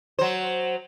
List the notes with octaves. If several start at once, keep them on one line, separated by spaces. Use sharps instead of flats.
F#3 C5